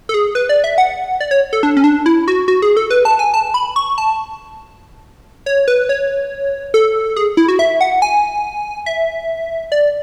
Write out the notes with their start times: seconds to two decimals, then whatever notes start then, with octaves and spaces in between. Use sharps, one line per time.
0.09 A4
0.14 G#4
0.35 B4
0.49 D5
0.64 E5
0.78 F#5
1.20 D5
1.31 C#5
1.53 A4
1.63 D4
1.77 C#4
1.84 D4
2.06 E4
2.28 F#4
2.48 F#4
2.62 G#4
2.77 A4
2.90 B4
3.05 A5
3.19 G#5
3.34 A5
3.54 B5
3.76 C#6
3.98 A5
5.46 C#5
5.68 B4
5.89 C#5
6.74 A4
7.16 G#4
7.37 E4
7.48 F#4
7.59 E5
7.81 F#5
8.02 G#5
8.86 E5
9.72 D5